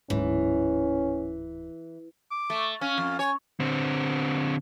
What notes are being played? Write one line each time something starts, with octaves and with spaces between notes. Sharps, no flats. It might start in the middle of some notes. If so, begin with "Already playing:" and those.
D1 G#2 E3 C#4
D6
A3
C#4 F5
F2
C#5 G#5
D3 C4